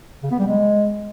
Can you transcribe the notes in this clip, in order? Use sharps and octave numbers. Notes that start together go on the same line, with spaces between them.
C#3
B3
G3
G#3